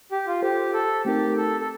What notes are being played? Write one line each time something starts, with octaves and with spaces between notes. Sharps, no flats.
G4
F4
F4 G4 A4 C5 G5
A4
A3 C4 D#4 G4 A#4
A4
A4